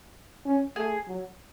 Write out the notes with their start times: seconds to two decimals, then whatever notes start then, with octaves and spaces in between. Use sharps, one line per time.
0.45 C#4
0.76 A3 G#4
1.08 F#3